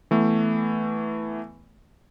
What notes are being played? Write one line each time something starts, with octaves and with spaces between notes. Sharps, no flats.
E3 A3 B3